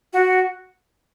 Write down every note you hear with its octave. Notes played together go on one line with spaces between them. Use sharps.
F#4